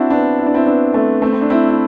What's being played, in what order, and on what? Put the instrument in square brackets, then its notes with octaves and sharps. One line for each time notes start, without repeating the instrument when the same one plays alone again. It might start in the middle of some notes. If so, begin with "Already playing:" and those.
Already playing: [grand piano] C4 D4 E4 F#4
B3 D4
E4
D4
C4 E4
B3 D4
A3 C4
A3 C4
C4
D4
C4 E4
E4